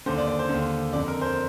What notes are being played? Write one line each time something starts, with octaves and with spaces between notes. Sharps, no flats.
D#2 D3 C5
D5
D5
C5
D#2 D3
F2 D3 D5
A#4
C5